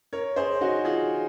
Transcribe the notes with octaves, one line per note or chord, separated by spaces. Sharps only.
A#4 C#5
G#4 C5
D#4 F#4
F4 G#4